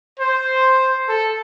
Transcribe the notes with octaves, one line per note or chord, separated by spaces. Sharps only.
C5
A4